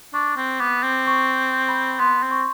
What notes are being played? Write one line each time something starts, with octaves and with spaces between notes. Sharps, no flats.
D4 C#6
C4
B3 D6
C4
C#6
B5
B3 C6
C4
C#6